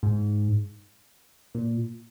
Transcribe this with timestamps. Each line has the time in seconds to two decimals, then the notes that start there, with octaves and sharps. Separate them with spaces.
0.03 G#2
1.54 A#2